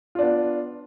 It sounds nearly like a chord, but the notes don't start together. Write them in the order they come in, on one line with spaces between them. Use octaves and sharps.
F4 D4 B3